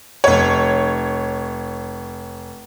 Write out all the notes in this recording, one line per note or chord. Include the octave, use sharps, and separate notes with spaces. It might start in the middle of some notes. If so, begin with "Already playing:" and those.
F1 C#5